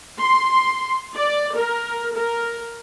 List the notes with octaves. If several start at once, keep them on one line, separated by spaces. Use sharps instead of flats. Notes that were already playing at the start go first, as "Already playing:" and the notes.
C6
D5
A#4
A#4